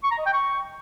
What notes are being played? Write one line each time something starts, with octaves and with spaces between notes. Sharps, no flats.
C#6
A#5
D#5
G5
C#6